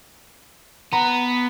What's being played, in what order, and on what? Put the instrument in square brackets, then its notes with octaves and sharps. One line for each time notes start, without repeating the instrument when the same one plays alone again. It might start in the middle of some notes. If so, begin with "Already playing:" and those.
[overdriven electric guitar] B3 [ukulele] A#5 B5